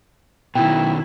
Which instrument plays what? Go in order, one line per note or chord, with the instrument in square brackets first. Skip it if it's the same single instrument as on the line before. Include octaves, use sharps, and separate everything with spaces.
[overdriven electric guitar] B2 D#3 [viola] E4 [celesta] G5